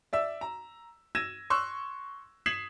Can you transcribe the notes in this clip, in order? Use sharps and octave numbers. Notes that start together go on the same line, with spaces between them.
D5 E5 E6
A#5
E6 G#6 A#6 D#7 E7
C6 C#6 E6 F#6
D#6 G#6 B6 C7 E7 F#7